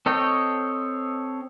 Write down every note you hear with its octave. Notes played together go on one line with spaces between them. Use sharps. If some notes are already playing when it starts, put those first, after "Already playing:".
C4 A4 C#5 D#5 G5